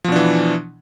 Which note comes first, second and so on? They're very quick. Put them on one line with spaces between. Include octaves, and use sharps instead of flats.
F3 B2 D4 E3